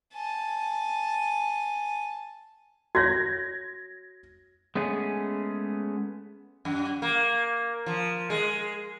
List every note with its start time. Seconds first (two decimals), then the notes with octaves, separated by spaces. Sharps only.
0.14 G#5 A5
2.95 F#4 C#5 G#6 A#6
4.75 G#3 A3 B3 C#4 G#4
6.65 F#2
7.02 A#3
7.86 F3
8.30 G#3